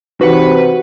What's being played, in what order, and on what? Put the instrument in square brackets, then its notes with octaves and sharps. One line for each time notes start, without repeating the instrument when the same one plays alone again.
[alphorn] C3 [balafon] E3 D#4 [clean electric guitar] F#4 F#5 [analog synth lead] B4